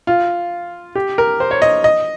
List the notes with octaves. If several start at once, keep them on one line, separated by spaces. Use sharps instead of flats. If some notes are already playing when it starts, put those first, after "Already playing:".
F4
G4
A#4
C5
C#5
D#5
D#5